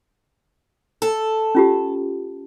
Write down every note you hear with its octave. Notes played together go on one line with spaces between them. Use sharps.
A4
C#4 F4 G4